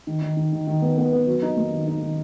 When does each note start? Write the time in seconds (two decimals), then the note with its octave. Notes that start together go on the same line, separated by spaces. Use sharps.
0.07 D#3
0.22 D#3
0.37 D#3
0.52 D#3
0.67 D#3
0.82 B3
0.98 B3
1.12 B3
1.27 F#3
1.42 D#4
1.57 A#3
1.72 D#3
1.87 D#4
2.02 D#3